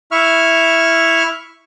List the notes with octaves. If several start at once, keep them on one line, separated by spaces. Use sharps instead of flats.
E4 E5 C#6 F6